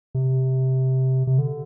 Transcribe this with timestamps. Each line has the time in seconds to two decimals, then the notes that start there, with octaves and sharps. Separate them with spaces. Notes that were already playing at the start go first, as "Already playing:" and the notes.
0.15 C3
1.27 C3
1.38 D3